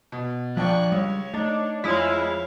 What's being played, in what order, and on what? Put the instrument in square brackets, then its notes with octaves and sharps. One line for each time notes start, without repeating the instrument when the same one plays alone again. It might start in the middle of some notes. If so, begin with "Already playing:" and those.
[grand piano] B2
[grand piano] A#1 D4 G5 [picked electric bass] F3 [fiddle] C#6 F#6
[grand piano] C#2 [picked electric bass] G3 [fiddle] C#5
[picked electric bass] A3 [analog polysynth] D4 [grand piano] D#4
[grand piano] F2 [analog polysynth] G#3 E4 [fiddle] C#5 F5